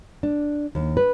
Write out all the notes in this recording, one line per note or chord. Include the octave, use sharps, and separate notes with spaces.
D4
D#2
B4